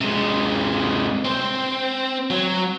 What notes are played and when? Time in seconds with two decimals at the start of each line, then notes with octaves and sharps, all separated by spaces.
0.01 C3 G#3
1.25 C4
2.30 F#3